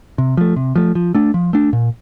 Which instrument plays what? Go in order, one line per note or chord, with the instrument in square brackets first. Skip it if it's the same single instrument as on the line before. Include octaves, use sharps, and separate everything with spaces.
[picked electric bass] C3
F3 A3
C3
F3 A3
F3
A3 D4
F3
A3 D4
A#2